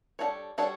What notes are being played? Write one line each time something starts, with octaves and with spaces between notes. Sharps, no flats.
G3 D4 F#4 A4 C#5
G3 D4 F#4 A4 C#5